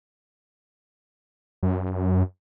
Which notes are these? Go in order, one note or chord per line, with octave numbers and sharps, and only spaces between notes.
F#2